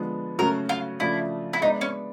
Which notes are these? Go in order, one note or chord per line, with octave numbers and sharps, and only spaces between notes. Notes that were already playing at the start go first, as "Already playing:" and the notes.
Already playing: D3 F3 G#3 B3
C#3 F#3 A3 C#4 F#4 A#4
F4
C#3 F3 A3 D4 E4 F4
E4
G#3 B3 D4 D#4
C#4